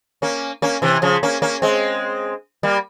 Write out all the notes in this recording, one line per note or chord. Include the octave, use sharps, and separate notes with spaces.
A#3 C#4
A#3 C#4
C3 E3
C#3 F3
A#3 C#4
A#3 C#4
G#3 C4
G3 A#3